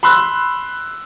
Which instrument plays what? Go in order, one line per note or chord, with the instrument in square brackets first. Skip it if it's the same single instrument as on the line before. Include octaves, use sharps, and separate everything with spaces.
[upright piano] B5 C6 E6 F#6